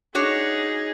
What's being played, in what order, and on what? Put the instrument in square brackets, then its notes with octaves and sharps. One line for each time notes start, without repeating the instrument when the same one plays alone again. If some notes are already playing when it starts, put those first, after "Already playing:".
[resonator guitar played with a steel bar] D4 F#4 C#5 [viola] D#4 G#4